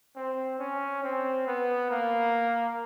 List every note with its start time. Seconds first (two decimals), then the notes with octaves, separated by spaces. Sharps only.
0.16 C4
0.59 C#4
1.03 C4
1.47 B3
1.90 A#3